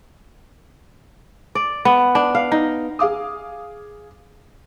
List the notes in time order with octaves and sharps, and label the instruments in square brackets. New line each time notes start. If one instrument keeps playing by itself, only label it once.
[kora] D5
B3
D4
F5
D#4
[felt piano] G#4 F5 D6 D#6